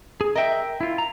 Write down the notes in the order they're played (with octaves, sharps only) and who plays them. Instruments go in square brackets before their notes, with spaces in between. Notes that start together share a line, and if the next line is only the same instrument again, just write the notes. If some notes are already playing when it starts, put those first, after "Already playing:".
[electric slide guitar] G#4
[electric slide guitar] A#4 G5 [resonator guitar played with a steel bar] D#5 E5
[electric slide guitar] E4 F4
A#5